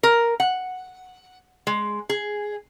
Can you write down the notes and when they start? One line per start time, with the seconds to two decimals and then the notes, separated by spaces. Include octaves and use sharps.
0.03 A#4
0.40 F#5
1.67 G#3
2.09 G#4